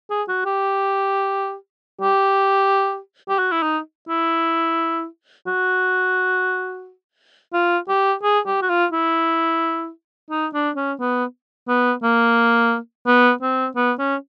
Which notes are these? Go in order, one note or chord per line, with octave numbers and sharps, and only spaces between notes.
G#4
F#4
G4
G4
G4
F#4
E4
D#4
E4
F#4
F4
G4
G#4
G4
F#4
F4
E4
D#4
D4
C#4
B3
B3
A#3
B3
C4
B3
C#4